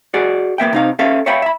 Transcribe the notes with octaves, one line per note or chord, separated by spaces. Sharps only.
F#4 G#4 D5
A#3 B3 E5 G5
C3 D#4 F5
C#4 A4 E5 F5
C#5 E5 F5 G5 B5
E5 B5